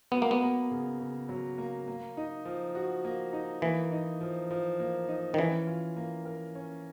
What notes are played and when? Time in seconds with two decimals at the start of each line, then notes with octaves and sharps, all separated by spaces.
0.11 F#3 B3
0.22 A#3
0.31 B3
0.42 A#3
0.71 C#3
1.00 C#3
1.29 F#3
1.58 A#3
1.88 A#3
2.17 D#4
2.45 F3
2.75 F#4
3.04 A#3
3.33 D#4
3.62 E3 A#3
3.92 D#4
4.21 F3
4.51 F3
4.80 A#3
5.08 D#4
5.34 D#3
5.38 E3 C#4
5.67 F4
5.97 A#3
6.25 A#4
6.55 C#4